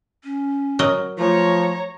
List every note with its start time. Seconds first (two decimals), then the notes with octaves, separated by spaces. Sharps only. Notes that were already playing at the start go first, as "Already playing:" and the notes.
0.24 C#4
0.79 F#3 A#4 D#5
1.18 F3 A3 C#5 A#5